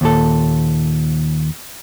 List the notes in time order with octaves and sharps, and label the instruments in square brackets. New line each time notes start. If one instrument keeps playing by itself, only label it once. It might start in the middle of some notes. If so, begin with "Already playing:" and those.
[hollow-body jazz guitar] D#2 A#2 A4